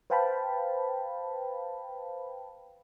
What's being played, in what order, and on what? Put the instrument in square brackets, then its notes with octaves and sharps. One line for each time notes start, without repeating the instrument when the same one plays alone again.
[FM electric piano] B4 C5 F5 G5 A5 B5